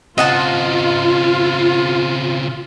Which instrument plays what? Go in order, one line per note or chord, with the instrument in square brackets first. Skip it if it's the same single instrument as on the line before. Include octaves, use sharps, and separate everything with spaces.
[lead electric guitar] C#3 C4 [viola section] F4 [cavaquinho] D#5 F#5 A5